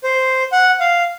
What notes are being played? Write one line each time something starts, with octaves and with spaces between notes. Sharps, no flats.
C5
F#5
F5